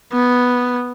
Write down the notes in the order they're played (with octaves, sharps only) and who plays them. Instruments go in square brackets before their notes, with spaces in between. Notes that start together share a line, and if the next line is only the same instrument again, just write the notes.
[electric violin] B3